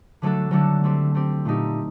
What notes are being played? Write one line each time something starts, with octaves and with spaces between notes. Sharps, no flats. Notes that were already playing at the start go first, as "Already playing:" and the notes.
D3 F#3 A3 D4 A4
D3 F#3 A3 D4 A4
A3 C4 G4
A3 C4 G4
A#2 A3 D#4 G4